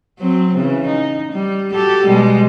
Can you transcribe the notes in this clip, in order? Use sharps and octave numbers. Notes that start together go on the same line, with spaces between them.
F#3 C4
C#3 E3
D#4
G3
F#4 G4 A4
B2 G3 G#3